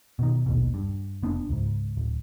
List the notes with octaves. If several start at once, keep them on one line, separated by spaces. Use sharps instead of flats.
B2 D#3
A#1 D#2 B2
G2
F1 B3 D4
C#2 G#2
D1